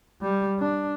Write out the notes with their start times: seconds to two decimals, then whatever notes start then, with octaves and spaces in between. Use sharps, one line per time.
0.21 G3
0.59 D4